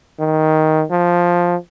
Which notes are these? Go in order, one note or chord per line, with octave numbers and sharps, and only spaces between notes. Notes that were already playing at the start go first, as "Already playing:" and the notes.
D#3
F3